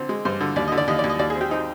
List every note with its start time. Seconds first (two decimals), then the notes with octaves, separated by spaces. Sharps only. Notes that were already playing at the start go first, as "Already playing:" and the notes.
Already playing: D3 C4
0.09 G#3
0.25 G2 C5
0.41 D3
0.56 D#2 D5
0.68 D#5
0.72 D3
0.78 D5
0.88 D#2 D#5
0.99 D5
1.04 D#2
1.10 D#5
1.19 D#2 D5
1.30 G#4
1.36 C4
1.41 G4
1.51 C4 D#4